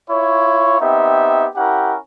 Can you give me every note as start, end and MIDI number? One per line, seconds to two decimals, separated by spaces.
0.10 0.79 64
0.10 0.79 65
0.10 0.79 73
0.81 1.46 59
0.81 1.46 60
0.81 1.46 63
0.81 1.46 67
0.81 1.46 76
1.55 1.96 61
1.55 1.96 64
1.55 1.96 67
1.55 1.96 70
1.55 1.96 78